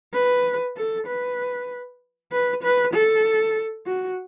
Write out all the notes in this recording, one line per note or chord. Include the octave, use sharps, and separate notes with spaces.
B4
A4
B4
B4
B4
A4
F#4